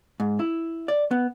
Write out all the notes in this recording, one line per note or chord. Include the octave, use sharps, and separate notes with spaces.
G#2
E4
D5
B3